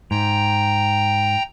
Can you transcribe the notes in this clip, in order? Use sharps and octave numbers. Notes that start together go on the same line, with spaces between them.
G#2 G5 A#5